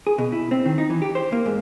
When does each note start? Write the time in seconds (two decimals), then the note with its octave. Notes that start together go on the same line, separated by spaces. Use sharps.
0.07 G#4
0.18 B2
0.32 E4
0.51 C4
0.66 D#3
0.78 D#4
0.90 E3
1.02 G4
1.15 C5
1.33 A#3
1.46 G#2